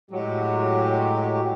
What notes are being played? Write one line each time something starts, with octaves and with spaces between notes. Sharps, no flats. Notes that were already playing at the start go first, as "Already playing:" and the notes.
A2 F#3 G#3 G4